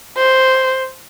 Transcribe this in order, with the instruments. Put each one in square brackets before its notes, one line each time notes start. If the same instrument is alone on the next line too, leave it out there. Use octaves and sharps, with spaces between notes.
[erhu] C5